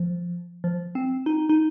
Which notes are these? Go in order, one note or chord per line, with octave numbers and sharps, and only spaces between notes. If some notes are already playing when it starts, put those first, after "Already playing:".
Already playing: F3
F3
C4
D#4
D#4